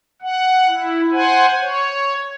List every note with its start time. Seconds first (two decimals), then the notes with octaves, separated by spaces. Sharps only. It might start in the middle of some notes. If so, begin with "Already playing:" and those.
0.22 F#5
0.68 E4
1.12 C5 F#5 G#5
1.61 C#5